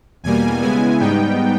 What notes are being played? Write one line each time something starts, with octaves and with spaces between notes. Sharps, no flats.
E2 B2 G3 A#3 G#5
C#3 G#3 B3 E4 G#5
G#2 G3 B3 D#4 G5